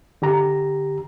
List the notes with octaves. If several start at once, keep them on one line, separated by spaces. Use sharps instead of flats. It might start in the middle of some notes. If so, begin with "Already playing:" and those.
D3 G4 A#5